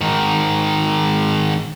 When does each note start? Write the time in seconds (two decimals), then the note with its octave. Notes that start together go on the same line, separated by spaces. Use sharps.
0.01 G#2 D#3